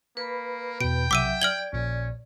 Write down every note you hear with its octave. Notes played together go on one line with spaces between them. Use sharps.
A#3 B4 B5
E2 B2 G5 D7
B1 C3 F#3 E5 D6 E6 D#7
D5 F6 G#6 F#7 G7
A#1 A#2 C#4